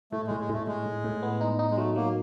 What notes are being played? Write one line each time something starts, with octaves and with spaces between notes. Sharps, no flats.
A2 A3
A2 G#3
G#3
A2 A3
A2 G#3
A2
A2
B3
D#4
D#4
G#3
F#3 A3
F#3 A#3